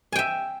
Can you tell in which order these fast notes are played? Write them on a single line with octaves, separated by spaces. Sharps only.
G#5 G5 E5